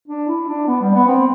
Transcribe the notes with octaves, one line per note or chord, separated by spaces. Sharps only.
D4
E4
D4
B3
G3
B3
C4